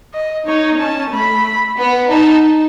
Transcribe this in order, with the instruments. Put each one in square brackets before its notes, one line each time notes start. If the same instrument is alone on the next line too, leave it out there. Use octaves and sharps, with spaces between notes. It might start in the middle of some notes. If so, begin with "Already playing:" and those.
[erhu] D#5
[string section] D#4 [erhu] C#5
[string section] C#4 [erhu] A5
[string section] A3 [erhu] B5
[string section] B3 [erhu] B5
[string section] D#4 [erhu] A5